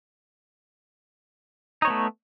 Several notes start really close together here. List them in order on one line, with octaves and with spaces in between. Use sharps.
D#4 C#5 B3 A3